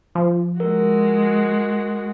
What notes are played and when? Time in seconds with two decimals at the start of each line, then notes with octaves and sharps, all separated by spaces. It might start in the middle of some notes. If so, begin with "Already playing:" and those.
0.15 F3
0.60 G#3 F#4 A#4